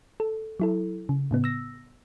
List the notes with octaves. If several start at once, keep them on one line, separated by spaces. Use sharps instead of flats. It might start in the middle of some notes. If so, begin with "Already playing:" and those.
A4
F#3 E4 A4
C#3
A2 C#3 B3
E6 A#6